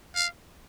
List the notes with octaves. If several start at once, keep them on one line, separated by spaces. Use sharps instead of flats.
F5